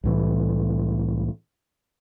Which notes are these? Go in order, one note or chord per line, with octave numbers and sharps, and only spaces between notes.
C2 A2 E3